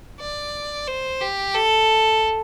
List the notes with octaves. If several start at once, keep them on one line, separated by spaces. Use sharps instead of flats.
D5
C5
G4
A4